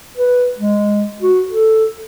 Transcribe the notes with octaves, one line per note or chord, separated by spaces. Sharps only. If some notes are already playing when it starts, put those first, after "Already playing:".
B4
G#3
F#4
A4